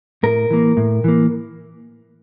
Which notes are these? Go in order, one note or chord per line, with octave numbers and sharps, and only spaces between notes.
A2 A#4
E3 A#3
A2
E3 A#3